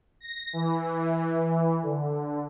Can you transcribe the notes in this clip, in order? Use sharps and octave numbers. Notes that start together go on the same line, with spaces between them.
A#6
E3
D3